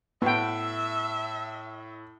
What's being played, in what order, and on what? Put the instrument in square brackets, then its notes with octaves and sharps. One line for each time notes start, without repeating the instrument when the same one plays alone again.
[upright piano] A2 [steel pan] B3 G5 [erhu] E5